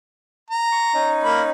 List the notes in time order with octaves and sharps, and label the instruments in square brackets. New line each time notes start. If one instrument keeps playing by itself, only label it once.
[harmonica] A#5
[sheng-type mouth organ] C#6
C#4 D#4
[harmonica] A#3 B5